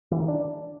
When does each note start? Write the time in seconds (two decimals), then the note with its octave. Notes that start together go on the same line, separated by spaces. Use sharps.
0.11 E3
0.20 D#3
0.28 D4